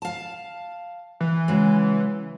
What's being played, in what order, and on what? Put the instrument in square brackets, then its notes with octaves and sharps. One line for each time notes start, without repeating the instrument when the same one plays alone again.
[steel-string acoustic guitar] F5 A5
[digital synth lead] E3
[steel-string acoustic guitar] C#3 F#3 G#3